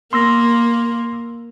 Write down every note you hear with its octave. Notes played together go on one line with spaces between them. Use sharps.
A#3 C6 E6 A#6